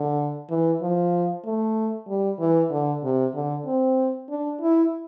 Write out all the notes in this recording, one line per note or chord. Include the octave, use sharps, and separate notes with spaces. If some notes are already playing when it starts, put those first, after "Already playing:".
Already playing: D3
E3
F3
A3
G3
E3
D3
C3
D3
C4
D4
E4